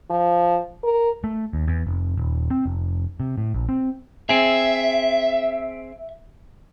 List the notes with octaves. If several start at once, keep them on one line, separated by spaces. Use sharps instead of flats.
F3
A#4
A3
D#2
E2
F1
D#1
C4
F1
C3
A2
A#1
C4
C4 G#4 E5